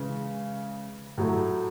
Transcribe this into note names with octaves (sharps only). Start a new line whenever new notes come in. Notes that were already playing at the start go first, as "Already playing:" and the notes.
Already playing: C#3 E3 G#3
A2 F#3 A3